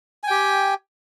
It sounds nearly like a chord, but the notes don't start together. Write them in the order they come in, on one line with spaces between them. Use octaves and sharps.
G#5 G5 G4